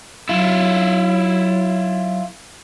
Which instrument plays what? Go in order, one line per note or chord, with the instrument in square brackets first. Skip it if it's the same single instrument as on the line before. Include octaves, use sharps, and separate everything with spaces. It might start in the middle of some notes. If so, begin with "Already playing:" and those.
[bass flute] F#3 [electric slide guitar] E4 F4